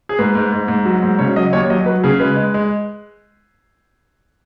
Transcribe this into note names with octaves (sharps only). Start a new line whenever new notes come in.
G#4
G#2 B4
G#2
G#2
G#2
F#3
G#2
C#3 C#5
F#3 D#5
D#2 C#5
F#3 D#5
F#3 B4
C#3 G#4
G#3 B4
G#3
G#3